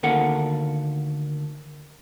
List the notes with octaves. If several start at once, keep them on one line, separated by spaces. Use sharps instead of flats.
D2 D#3 A#3 A4 F#5